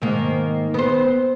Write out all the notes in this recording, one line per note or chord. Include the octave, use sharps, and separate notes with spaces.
G#2 D#3 A#3
B3 C5